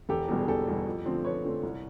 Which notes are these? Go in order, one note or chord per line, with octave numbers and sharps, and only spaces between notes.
E1 G4 A4
E2 B2 G3
G#4
E1 G4 A4
E2 B2 G3
F2
D3 F3 A3 C4
F2 B4 C#5
D3 F3 A3 C4
C2